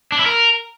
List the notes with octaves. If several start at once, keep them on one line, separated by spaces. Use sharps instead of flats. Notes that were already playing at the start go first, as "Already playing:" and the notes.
D4
E4
A#4